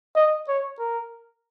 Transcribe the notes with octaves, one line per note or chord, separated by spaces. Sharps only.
D#5
C#5
A#4